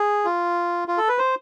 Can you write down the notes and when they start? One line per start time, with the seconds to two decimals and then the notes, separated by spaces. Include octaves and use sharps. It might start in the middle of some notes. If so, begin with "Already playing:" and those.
Already playing: G#4
0.25 F4
0.88 F4
0.98 A4
1.08 B4
1.19 C5